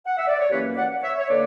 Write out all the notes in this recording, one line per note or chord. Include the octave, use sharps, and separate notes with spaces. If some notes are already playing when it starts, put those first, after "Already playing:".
F#5
E5
D5
C#5
F#2 E3 A#3 C#4 G4 B4
D5 F#5
C#5 E5
C#5
D3 A#3 D4 B4 D5